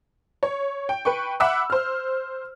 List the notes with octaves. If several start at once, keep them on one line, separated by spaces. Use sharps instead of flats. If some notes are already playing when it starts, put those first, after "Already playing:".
C#5
G5
B4 G5 C#6
E5 F#5 B5 D6 E6
C5 F6